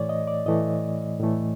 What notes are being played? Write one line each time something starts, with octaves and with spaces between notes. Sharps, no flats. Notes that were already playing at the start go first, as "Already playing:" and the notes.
Already playing: A2 E3 A3 C#5 D5
D#5
D5
A2 E3 A3 D#5
A2 E3 A3